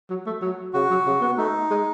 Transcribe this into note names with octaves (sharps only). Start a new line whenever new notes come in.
F#3
A3
F#3
C#3 F#4
F#3
C#3
B3
A3 D#4
G#3